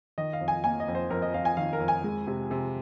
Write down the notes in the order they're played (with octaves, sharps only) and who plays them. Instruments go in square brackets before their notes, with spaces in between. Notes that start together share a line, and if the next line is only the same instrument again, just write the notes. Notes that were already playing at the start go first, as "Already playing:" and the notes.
[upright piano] D#3 D#5
F5
F2
G#5
A#3 G#5
D#5
F2
C5
F2 A#4
D#5
F2 F5
G#5
D#3 F5
A#4
F2
G#5
G#3
C3
C3